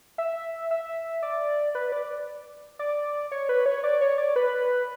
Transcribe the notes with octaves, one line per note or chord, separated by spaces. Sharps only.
E5
E5
D5
B4
D5
D5
C#5
B4
C#5
D5
C#5
D5
B4